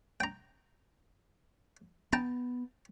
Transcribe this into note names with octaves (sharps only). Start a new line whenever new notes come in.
G5 A#5
B3 G5 A5 A#5